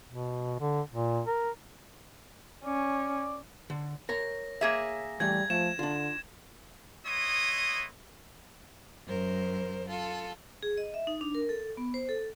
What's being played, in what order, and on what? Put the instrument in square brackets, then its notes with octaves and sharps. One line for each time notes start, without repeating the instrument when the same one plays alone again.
[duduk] B2
D3
A#2
A#4
[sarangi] C#4 [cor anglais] D5
[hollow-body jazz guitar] D3
[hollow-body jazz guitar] A#4 C#5 A#5 [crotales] A#6
[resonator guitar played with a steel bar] A#3 G#4 E5
[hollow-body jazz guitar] E3 A3 G4 [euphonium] G3 [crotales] G#6
[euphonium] F3 [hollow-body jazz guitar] A3 [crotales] E7
[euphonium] D3 [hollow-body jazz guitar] D4 F4
[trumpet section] B3 E4 C#5 D#5 C6 D#6
[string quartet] F#2 A#4 C5
F4 A4
[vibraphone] G#4
D#5
E5
D#4
D4
A#4
A4
B3
C5
A4